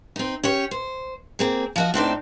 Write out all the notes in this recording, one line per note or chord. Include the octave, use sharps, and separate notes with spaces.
C4 D#4
C#4 G4 C#5
C5
A#3 C4 G#4
F3 F#4 D#5
A2 C4 D4 D#4